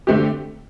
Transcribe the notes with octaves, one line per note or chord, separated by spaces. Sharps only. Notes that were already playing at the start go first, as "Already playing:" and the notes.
D3 A3 C4 G4